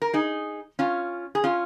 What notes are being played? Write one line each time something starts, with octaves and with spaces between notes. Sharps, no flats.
A#4
D#4 G#4
C#4 F4
G#4
C#4 F4